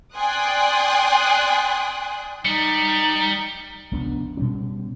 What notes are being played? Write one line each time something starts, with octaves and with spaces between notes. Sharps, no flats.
D5 G5 G#5 C6 D#6 F#6
G3 D#4 C#7
F1 C#2 B3 D4
B2 G3 C#4